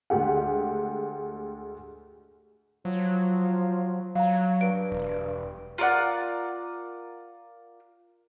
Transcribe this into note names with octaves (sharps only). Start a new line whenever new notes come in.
D2 G#3 G4 F#5
F3 F#3
F#3 F5 A#5
G2 D7
E1
F4 A#4 D5 F#5